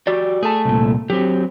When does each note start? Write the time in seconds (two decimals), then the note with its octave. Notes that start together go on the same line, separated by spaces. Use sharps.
0.07 F#4 G4 D5
0.43 A3 G#4 A5
0.65 C2 A#2
1.10 F#3 C4 G4